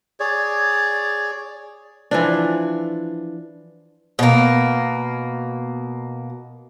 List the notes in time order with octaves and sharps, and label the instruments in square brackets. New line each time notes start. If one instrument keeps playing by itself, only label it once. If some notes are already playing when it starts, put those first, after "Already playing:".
[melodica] G#4 C#5 D5
[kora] E3 F3 D4
[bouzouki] B2 A#3